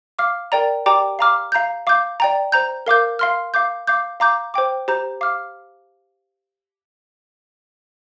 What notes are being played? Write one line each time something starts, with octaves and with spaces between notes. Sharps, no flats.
F5 D6 F6
A#4 D5 G5 A#5
G4 D5 G5 A#5 D6
F5 A#5 D6 F6
F5 A#5 G6
F5 D6 G6
D5 G5 A#5
C5 A#5 G6
A#4 F5 D6 G6
F5 C6 F6
F5 D6 G6
F5 D6 G6
F5 A#5 D6 G6
C5 G5 D6
G4 C5 A#5 G6
F5 D6 F6